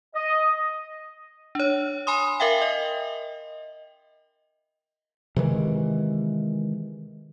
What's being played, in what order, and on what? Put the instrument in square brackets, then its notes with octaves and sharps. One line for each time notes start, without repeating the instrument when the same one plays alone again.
[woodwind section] D#5
[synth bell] D4 C#5
G#5 B5 C6 D#6
A#4 E5 F5 G5
D#5
[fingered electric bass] C3 D#3 E3 G#3